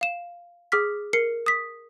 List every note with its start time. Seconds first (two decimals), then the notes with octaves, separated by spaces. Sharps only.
0.01 F5 E7
0.72 G#4 D6 F6 B6
1.13 A#4 C7 C#7
1.46 D#6 B6